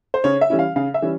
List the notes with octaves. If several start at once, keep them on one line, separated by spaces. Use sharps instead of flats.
C5
C#3 C#5
E5
E3 G3 C#4 E4
F5
C#3 F5
E5
E3 G3 C#4